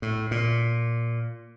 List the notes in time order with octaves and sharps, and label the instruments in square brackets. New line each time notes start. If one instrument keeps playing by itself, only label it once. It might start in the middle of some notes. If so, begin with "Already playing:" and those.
[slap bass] A2
A#2